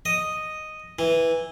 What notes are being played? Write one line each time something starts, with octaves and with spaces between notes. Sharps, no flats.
D#5
E3